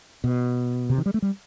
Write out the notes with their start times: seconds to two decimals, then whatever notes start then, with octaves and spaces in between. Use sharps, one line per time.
0.24 B2
0.90 C3
0.98 D#3
1.06 G3
1.14 A3
1.22 G3